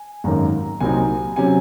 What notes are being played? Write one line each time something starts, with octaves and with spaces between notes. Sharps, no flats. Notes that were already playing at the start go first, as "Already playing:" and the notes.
Already playing: G#5
G#1 F#2 D#3 A#3 A#5
C2 A#2 F#3 C4 D#4 G#5
C3 F#3 C#4 G#5